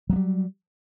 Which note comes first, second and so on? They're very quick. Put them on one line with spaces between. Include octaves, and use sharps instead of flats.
F#3 A#3 G3